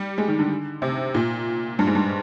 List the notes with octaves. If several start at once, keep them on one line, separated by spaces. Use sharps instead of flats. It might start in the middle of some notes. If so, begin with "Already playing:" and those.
Already playing: G3
G#3
D#3
D3
C3
A#2
G2
G#2
G2